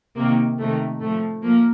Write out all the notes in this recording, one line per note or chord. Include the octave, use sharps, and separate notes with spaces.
C3 D#3 A#3
C3 D#3 A3
A2 F3 A3
F3 A#3